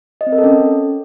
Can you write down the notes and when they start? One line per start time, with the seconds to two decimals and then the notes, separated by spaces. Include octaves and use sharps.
0.21 D#5
0.27 C4
0.32 A#4
0.38 A4
0.44 C#4